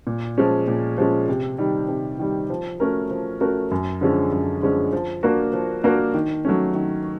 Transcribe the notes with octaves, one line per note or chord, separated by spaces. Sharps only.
A#2
F3 G#3 C#4
A#2
F3 G#3 C#4
C3
D#3 G3
C3
D#3 G3
F3
A3 C#4 F#4 A#4
F3
A3 C#4 F#4 A#4
F#2
D3 F3 G#3 C#4
F#2
D3 F3 G#3 C#4
F3
A#3 D4 F#4 A#4
F3
A#3 D4 F#4 A#4
D#3
F#3 A3 C#4
D#3